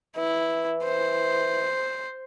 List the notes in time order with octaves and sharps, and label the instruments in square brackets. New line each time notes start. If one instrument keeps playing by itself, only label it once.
[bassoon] E3 [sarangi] E4
[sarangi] C5